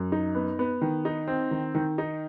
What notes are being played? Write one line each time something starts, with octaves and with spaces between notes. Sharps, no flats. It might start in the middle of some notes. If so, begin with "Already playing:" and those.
Already playing: F#2
D#4
B3
B3
D#3
D#4
C4
D#3
D#3
D#4